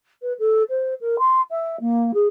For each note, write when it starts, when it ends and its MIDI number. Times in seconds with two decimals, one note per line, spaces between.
0.22 0.33 71
0.39 0.63 69
0.69 0.94 72
1.01 1.16 70
1.19 1.41 84
1.51 1.77 76
1.80 2.12 58
2.14 2.27 68